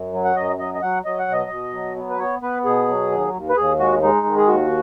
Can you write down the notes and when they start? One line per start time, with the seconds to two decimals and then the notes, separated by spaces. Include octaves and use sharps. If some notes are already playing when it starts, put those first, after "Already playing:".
Already playing: F#2
0.13 F#3
0.25 F#5
0.36 F#2 D#5
0.59 F#3 D#5
0.74 D#5
0.82 F#3 F#5
1.05 F#3 D#5
1.19 F#5
1.28 B2 D#5
1.50 B2
1.73 F#3
1.97 B3
2.10 B4
2.19 B3 C#5
2.42 B3 B4
2.65 B2 G#4
2.88 F#3
3.11 D#2
3.33 D#2
3.49 B4
3.57 D#2 G#4
3.79 G#3 F#4
4.02 G#3 D#4
4.26 D#3
4.37 G#4
4.48 D#2 F#4